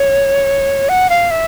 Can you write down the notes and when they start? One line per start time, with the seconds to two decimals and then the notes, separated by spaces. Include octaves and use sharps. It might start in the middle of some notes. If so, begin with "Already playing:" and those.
Already playing: C#5
0.89 F#5
1.10 F5
1.31 E5